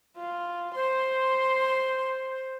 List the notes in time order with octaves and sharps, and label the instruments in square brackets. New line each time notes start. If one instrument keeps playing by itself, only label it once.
[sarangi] F4
[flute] C5 [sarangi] C6